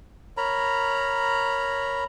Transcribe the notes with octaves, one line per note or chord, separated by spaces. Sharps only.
A#4 C#5 A#5 B5